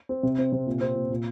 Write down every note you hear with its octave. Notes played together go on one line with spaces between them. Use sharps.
C4
C3
C4
C3
A#2
C4
A#2
A#2